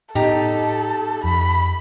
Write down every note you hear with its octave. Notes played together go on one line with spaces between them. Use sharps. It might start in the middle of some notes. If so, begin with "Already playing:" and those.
A2 B3 D#4 G4 A4
F2 B5